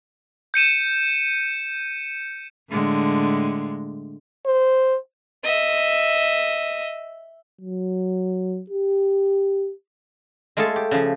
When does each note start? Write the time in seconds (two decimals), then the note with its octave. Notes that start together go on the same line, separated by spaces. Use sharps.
0.54 G6 C#7 D#7 E7
2.70 A2 D3 G#3
4.46 C5
5.44 D#5 E5
7.61 F#3
8.70 G4
10.57 G#3 A3 F4 G#4 A4
10.76 G4
10.91 C#3 F3